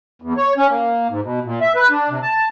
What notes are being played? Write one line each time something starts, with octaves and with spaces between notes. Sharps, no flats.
E2
C#5
C#4
A#3
G#2
B2
A#2
E5
B4
D4
C3
A5